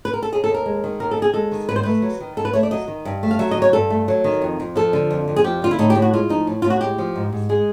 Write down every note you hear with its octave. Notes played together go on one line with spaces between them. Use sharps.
B4
A#4
A4
D#2 G#4
A4
D#2
A#4
G#3
D#3
D#2 A#4
A4
D#2 G#4
G#3 A4
D#3
G#2 B4
C5
A3 B4
F#3
D#3
G#2 A4
B4
A3 C#5
D5
F#3 D#5
D#3
G2
A3
F5
F#3 E5
D#5
D#3 C#5
G2 A4
A3
F#3
D#3
F2
F2
F3 A4
D3
F2
F2
G#4
F3 G4
D3 F4
E4
A2 D#4
G4
A2
F#4
G#3 F4
F3 D#4
A2
A2 F4
F#4
G#3 G4
F3
G#2
G#2
G#3 G#4